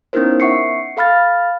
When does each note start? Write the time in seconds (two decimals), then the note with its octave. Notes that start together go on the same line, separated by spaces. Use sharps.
0.13 B3 C#4 D#4 E4 A#4 C5
0.40 E5 F#5 C#6 C7 C#7
0.97 A4 F5 B5 F6 A6